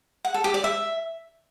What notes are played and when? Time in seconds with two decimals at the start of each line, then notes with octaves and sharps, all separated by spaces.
0.25 F#5
0.34 A4
0.44 G4
0.54 D5
0.64 E5